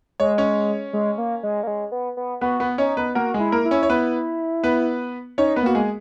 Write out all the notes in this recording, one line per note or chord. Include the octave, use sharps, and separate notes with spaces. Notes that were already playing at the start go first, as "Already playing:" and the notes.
G#3 C#5
C#4 C#5
G#3
A#3
G#3
A#3
G#3
B3
B3
B3 F#4 B4
B3 B4
C#4 D#4 C#5
B3 B4
A#3 F#4 A#4
G#3 G#4
E4
A#3 A#4
E4
C#4 C#5
C#5
B3 B4
B3 B4
C#4 D#4 C#5
B3 B4
A#3 F#4
G#3 G#4